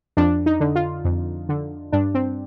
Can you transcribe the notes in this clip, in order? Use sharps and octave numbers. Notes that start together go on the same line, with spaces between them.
F2 D4
D#4
D3
F4
F2
D3
G2 D4
C4